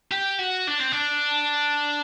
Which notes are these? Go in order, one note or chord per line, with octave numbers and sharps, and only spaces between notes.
G4
F#4
D4
C4
D4